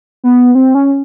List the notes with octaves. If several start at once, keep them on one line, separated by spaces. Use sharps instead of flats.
B3
C4
C#4